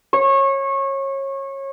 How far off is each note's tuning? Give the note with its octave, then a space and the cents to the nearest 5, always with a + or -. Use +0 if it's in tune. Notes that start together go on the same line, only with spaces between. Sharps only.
C#5 -25